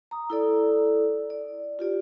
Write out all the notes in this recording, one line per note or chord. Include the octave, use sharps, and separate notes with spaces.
A#5 D#6
E4 A4 D5
D5
F4 G4 D5